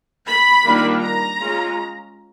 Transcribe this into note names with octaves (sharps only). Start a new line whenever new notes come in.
B5
D#3 G3 A#3 D4 F4
A#5
G#3 C#4 F4